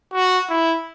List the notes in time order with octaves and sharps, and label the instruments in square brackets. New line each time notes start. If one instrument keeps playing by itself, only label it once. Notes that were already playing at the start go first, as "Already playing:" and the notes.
[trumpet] F#4
E4